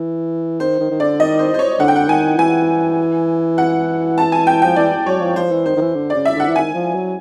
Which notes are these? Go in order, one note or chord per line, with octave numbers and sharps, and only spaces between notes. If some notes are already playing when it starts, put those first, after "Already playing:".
Already playing: E3
D#3 C5
D#3
D#3
D3 D5
D#3 D#5
C5
C5
C#5
D3 F#5
G5
F#5
D#3 G#5
E3 G#5
F#5
A5
G#5
G5
F3 G5
E3 D5
F#3 C#5
F3
F3 C5
E3
D#3 C5
D#3
E3
D3
D5
C#3
E5
D3 F#5
E3
D#3 G#5
F3
F#3